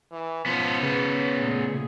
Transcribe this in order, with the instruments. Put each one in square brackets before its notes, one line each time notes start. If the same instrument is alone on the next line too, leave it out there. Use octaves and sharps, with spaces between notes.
[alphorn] E3
[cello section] G#2 B2 [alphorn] F3 [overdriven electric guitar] B3 C#4
[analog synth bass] C#3 [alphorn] B4
[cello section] A#2 A3 G#4